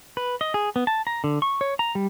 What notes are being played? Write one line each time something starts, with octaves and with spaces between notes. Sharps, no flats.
B4
D#5
G#4
B3
A5
A#5
D3
C#6
C#5
A#5
G3